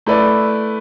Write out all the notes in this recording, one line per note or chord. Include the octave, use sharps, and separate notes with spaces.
A3 E4 B4 D5